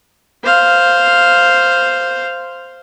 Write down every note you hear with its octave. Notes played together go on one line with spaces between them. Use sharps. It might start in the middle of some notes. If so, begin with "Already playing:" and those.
C5 F5